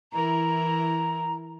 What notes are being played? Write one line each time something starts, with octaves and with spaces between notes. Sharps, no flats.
E3 E4 A#4 A#5